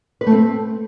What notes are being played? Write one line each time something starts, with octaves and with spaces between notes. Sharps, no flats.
B4
A3
C4